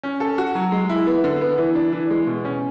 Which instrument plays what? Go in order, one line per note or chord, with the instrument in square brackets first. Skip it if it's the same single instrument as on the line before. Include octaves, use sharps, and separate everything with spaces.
[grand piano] C#4
A4
F#4
F#3
G#3
E4
B3
D3
B3
E3
D4
E3
G#3
B2
C#4